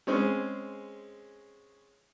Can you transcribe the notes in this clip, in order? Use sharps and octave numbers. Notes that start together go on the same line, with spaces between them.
G#3 C4 C#4 G#4